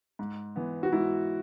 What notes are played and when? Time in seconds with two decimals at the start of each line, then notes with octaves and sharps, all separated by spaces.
0.19 G#2
0.56 E3 B3
0.83 F#4
0.92 G#2 E4